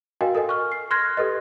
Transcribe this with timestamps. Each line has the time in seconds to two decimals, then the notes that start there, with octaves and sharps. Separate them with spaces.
0.21 F#4 A#4 D#5 F5 G5 G#5
0.35 A4 A#4 D#5 G#5
0.49 C#6 F6
0.72 C7
0.91 C6 F6 F#6 G#6 A#6
1.17 G4 A4 B4 D#5